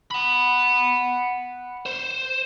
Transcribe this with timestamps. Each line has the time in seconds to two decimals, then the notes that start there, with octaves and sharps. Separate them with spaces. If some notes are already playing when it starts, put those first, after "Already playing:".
0.11 F#5 B5
1.86 C5